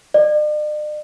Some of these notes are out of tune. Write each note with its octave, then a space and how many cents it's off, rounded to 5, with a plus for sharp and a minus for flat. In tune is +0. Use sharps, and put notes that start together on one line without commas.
D5 +45